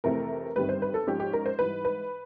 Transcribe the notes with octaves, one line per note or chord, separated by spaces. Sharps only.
F2 C3 E3 A3 A#4
G1 G2 D#3 G3 C4 B4
C5
B4
A4
G#2 F3 G#3 C#4 G4
G4
A#4
C5
G#2 E3 G3 B4
B4